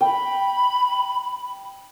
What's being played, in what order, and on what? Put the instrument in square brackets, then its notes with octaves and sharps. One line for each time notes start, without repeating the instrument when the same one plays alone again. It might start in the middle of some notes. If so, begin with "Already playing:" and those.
[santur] G5 [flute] B5